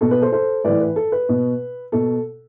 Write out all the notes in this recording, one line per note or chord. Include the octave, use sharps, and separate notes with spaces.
B2 A4
B4
A4 C5
A4 C5
A2 E3 B4 D5
B4
A4
B4
B2
B2 A4